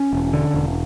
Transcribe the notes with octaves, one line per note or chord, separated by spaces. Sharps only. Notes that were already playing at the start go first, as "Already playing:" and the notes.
Already playing: C#4
E1
D3
E1